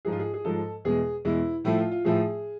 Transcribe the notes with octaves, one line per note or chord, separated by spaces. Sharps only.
G#2 F3 G#3 G#4
F4
G#4
G#4
G#2 F3 G#3 A4
E2 B2 G#3 G#4
E2 B2 G#3 E4
A2 F3 A3 E4
F4
F4
A2 F3 A3 G#4